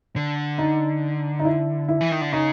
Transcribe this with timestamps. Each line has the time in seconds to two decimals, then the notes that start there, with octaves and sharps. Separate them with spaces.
0.16 D3
0.58 D#4
1.39 D#4
1.45 E4
1.88 E4
2.01 E3
2.11 D#3
2.21 D3
2.32 C#3 D#4